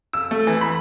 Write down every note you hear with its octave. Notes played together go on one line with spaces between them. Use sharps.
E6
A3
E3
B5